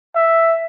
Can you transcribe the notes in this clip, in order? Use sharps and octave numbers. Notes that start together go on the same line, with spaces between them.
E5